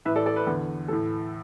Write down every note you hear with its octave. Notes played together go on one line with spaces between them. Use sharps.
A2 E3 B4 E5
A4 D5
A4 D5
B4
E2 D3
A2 E3 A4